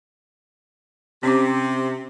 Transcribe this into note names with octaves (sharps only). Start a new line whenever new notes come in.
C3 C4 C#4 D6